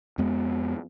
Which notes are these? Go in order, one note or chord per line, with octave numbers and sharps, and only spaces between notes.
F2 G#3 B3